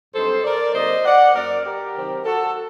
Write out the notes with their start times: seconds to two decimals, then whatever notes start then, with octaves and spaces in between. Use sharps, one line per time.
0.13 G2 F#3 C4 D#4 A4 C5
0.44 A#4 D5
0.74 C3 F#3 A#3 D#4 C5 D#5
1.05 D5 F#5
1.34 F#2 F#3 A#3 A#4 D5
1.65 G4 A#4
1.96 C3 D#3 F#3 C4 D#4
2.25 F#4 A4